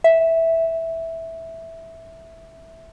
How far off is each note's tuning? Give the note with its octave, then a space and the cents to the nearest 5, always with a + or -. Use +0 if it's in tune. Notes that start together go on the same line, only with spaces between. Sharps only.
E5 -5